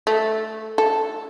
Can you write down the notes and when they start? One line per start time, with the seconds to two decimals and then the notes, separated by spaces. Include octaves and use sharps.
0.07 A3
0.78 A4